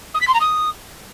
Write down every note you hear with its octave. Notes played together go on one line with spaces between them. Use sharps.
D#6
B6
C6
A#5
D#6